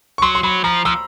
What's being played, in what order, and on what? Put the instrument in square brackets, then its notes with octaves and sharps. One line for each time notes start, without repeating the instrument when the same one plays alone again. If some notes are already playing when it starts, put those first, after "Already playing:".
[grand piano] C#6
[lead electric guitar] F#3 [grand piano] C6
[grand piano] C6
[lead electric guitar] F#3 [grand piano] B5
[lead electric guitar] F3 [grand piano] A#5
[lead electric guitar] F3 [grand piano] E6